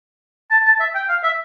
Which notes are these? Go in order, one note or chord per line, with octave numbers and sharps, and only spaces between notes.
A5
A5
E5
G5
F5
E5